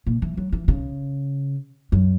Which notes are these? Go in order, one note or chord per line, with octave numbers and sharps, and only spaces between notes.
A#2
E3
F#3
E3
C#3
F#2